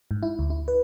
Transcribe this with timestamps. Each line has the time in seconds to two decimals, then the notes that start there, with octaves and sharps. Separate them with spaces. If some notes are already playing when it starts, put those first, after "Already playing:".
0.11 G#2
0.23 E4
0.39 D2
0.50 E4
0.68 B4